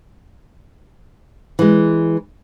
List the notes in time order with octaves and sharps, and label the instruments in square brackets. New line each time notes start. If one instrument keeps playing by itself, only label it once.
[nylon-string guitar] E3 G#3